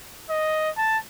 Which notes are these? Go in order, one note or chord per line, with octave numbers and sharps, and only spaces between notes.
D#5
A5